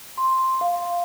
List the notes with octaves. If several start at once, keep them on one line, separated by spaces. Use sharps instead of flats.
C6
F5